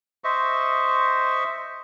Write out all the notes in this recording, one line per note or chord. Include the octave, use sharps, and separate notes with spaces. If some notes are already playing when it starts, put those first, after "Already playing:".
C5 D#5 E5 C#6